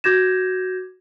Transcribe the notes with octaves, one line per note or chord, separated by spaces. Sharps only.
F#4 D6 G6 G#6 A#6 E7